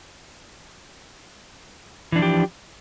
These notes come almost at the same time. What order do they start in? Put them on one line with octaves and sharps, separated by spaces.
E3 D4 F3 G4